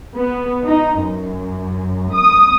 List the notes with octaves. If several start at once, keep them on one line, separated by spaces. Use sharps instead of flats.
B3
D#4
F#2
D#6